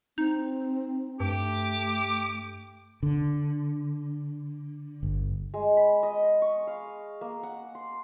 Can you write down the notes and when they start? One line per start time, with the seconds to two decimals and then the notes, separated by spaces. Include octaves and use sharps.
0.18 C4 D#4
1.20 G2 A3 G4 D6
3.03 D3
5.03 G1
5.54 G#3
5.77 B5
6.03 D#5
6.42 C#6
6.67 F5
7.21 A#3
7.43 F#5
7.75 C6